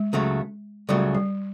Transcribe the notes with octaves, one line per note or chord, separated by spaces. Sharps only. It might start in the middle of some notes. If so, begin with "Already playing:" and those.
Already playing: G#3
C#2 C#3 F#3 A3
C#2 C#3 F#3 G3 A3
G3